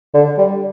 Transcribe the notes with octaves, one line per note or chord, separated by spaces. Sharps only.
D3
G3